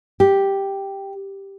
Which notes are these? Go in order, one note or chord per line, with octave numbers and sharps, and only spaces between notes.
G4